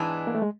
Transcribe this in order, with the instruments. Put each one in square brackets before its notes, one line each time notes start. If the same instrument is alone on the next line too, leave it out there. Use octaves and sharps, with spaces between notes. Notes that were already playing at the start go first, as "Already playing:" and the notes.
Already playing: [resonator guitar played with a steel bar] G#2 E3 G#3 B3 D4
[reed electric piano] A#3
A3
G#3